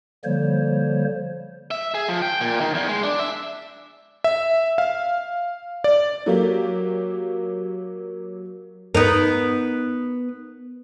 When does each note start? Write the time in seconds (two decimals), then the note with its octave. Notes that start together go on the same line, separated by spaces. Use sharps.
0.24 D3 F3 G3 A#3 C5 C#5
1.71 E5
1.94 G#4
2.08 F3
2.22 G5
2.40 A#2
2.61 D#3
2.74 E2
2.88 G#3
3.03 D4
3.19 E5
4.24 E5
4.78 F5
5.84 D5
6.26 F#3 A#3 G4
8.95 B3 D#4 A#4